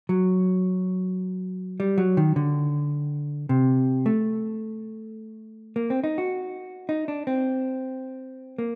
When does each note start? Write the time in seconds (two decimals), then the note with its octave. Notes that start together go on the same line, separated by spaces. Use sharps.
0.09 F#3
1.80 G3
1.98 F#3
2.17 D#3
2.36 D3
3.49 C3
4.06 A3
5.76 A#3
5.90 C4
6.04 D#4
6.18 F#4
6.89 D#4
7.08 D4
7.27 C4
8.59 A#3